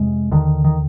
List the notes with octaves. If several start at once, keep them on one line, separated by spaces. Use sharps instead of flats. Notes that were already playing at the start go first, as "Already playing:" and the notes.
Already playing: F2 C3 G#3
D#2 D3 D#3
D#3